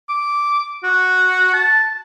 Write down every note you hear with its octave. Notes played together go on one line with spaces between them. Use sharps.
D6
F#4
A5